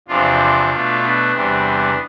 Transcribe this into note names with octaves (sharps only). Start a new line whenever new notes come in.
E2 C3 F3 D4 F4
B2 A3
B3 D4
E2 C3 G3